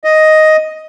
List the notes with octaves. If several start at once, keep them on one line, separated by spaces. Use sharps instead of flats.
D#5